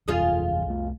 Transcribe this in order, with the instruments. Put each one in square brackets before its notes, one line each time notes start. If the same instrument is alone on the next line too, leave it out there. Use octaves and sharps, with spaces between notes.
[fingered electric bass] F#1 E2 [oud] F4 G#4 D#5
[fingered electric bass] C2 A3